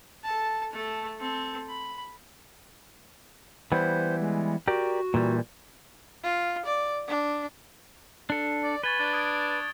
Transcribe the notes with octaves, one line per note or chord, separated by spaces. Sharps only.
A4 A5
A3 A4
C4 A4
B5
E3 G3 B3 C5
G#3
F#4 G4 A#4 D5
A#2 E3 G3
F4
D5
D4
D4 A4
D5
B4 G#5 C#6 A6 G7
D4 G#6
D#6 G#6 D7